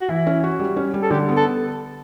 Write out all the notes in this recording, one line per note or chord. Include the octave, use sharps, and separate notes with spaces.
F#4
E3 E4
C#4
F#4
G3
C#4
G3
A4
D3 G4
B3
A4